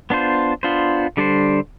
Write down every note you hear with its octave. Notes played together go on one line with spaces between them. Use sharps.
B3 D4 F4 C5
B3 D4 F4 C5
D3 G3 D4 A4 C5